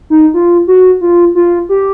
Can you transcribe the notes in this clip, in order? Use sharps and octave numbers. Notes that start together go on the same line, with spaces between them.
D#4
F4
F#4
F4
F4
G4